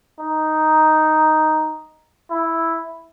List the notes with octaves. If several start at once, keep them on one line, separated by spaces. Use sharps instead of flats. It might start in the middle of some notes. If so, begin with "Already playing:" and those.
D#4
E4